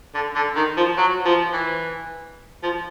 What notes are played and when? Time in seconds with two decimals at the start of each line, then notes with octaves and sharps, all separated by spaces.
0.14 D3
0.35 D3
0.56 D#3
0.77 F3
0.97 F#3
1.25 F3
1.52 E3
2.63 F3